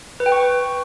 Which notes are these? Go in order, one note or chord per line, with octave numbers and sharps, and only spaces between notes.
B4
G5
C#6